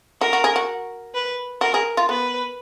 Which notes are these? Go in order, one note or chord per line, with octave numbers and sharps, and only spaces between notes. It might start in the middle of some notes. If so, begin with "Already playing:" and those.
F#4 A#4
F#4
G#4
F#4
B4
F#4 A#4
G#4
F4
B3 B4